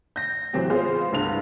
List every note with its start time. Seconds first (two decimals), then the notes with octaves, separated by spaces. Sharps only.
0.16 G6 A#6
0.53 A2 E3 F#3 C4 F#4 G4
0.70 G#3 B3 F4 G#4 C5 F5
1.12 C2 G2 F7